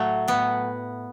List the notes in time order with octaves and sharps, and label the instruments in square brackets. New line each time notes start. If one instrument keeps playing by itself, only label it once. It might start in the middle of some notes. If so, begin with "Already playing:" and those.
Already playing: [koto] A2 F#3 A3
A2 B3